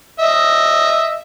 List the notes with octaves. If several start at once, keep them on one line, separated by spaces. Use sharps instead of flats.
D#5 E5